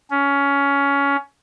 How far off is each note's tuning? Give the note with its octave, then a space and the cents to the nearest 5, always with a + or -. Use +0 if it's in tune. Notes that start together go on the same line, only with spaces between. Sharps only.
C#4 +20